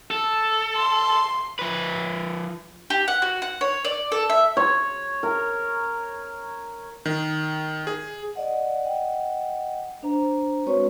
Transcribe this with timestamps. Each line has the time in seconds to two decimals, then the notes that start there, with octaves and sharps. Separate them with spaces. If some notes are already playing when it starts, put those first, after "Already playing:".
0.11 A4
0.77 C6
1.59 F3 B4
2.90 G4
3.08 F#5
3.22 F#4
3.42 F#5
3.61 C#5
3.85 D5
4.12 A4
4.30 E5
4.57 C#5
5.23 A#4
7.06 D#3
7.87 G#4
8.36 D5 D#5 F#5
8.84 D#5 F#5 G5
10.03 D4 C5 A#5
10.66 G#3 C4 F#4 B4 C#5 C#6